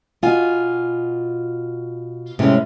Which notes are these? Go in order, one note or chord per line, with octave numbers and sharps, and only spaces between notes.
B2 F4 G#5
A2 C3 G#3 C4 C#4